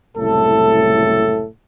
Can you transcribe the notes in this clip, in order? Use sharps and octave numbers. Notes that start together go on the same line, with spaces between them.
F#1 C2 A2 A4